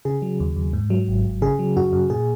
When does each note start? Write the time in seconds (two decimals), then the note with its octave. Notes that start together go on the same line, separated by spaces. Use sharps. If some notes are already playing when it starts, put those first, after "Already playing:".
0.05 C#3 G#4
0.22 F#3
0.40 D#2
0.56 D#2
0.73 G#2
0.90 F#3
1.08 G#1
1.25 G#1
1.42 C#3 G#4
1.59 F#3
1.76 F#2 F#4
1.93 F#2
2.10 A#2 G#4